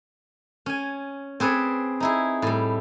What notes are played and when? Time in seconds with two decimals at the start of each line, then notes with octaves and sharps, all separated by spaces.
0.66 C#4 G#5
1.40 C4 G#4 B4 C#5 D5
2.00 D#4 E4 G#4
2.42 A2 G3